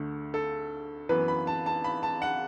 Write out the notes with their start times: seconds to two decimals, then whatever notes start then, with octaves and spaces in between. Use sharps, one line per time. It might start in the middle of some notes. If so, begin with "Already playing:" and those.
Already playing: D2 D3 A3
0.34 A4
1.09 F#2 E3 B3 B4
1.28 B5
1.47 A5
1.66 A5
1.84 B5
2.03 A5
2.22 F#5